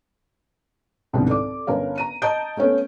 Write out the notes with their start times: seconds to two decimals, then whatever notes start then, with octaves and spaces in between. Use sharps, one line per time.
1.13 F1 C2 G#2 D#3 B3 D4
1.27 A4 D5 D6
1.67 G1 C#4 A#4 F5
1.98 A#5 D#7
2.22 D#5 A5 A#5 D#6 G6 D7
2.57 A3 B3 C#4 A4